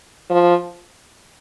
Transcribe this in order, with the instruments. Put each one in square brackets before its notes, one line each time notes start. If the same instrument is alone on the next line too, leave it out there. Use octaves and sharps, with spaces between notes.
[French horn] F3